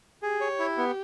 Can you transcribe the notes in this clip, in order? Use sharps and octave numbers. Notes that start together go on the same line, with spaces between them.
G4 G#4
C#5
E4
B3